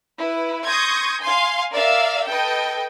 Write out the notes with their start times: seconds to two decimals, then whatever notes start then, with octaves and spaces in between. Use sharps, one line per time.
0.18 E4 B4
0.67 C6 C#6 D#6 G6 G#6 A#6
1.20 F5 G#5 C6
1.73 A#4 D5 E5 F5 E6
2.27 A4 B4 D#5 G5